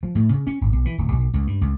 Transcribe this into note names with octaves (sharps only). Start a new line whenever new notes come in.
F3
A2
C#3
C#4
G#1
B1
E3
D1
B1
C#2
G2
C#2